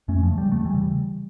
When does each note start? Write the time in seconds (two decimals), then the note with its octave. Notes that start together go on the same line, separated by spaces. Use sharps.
0.08 F2 A3 C#4
0.23 F3 A3
0.31 C#3
0.38 G3
0.52 E2 A3
0.65 E3 G3
0.75 C#3